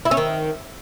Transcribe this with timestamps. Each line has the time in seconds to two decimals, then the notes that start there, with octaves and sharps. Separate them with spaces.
0.05 E4
0.11 C#4
0.17 D#3